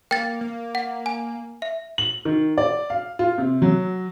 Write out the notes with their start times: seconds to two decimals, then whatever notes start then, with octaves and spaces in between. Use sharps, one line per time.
0.11 A#3 G5 A6
0.41 A#3
0.75 F#5
1.06 G#5
1.62 E5
1.98 F#7
2.25 D#3
2.58 D5
2.90 F5
3.19 F4
3.38 C3
3.62 F#3